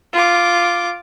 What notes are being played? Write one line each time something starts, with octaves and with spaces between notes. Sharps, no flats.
F4 D6